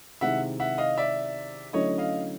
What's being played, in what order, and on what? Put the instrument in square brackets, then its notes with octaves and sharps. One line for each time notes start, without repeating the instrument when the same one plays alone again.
[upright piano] C3 D#3 G#3 C4 E4 [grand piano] E5 F#5
[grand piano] E5 F#5
D#5 F5
D5 E5
[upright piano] D3 F#3 A3 C#4 E4 [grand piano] C#5 D#5
[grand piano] D#5 F5